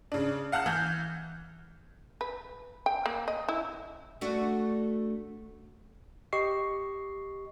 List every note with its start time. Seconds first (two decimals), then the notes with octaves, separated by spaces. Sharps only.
0.12 C#3 D4
0.52 F5 F#5 A5 F6 F#6
0.66 E3 G6
2.21 B4
2.86 G5
3.06 A#3
3.28 D#5
3.49 E4
4.21 A3 D4 F#4
6.33 G4 D#5 C#6 C7